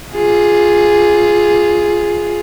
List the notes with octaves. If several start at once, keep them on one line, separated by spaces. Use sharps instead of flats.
F4 G#4